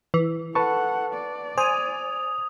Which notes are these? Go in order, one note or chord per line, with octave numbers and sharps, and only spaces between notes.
E3
A4 B4 F#5 A5 C#6
D5
C5 G#5 D#6 F7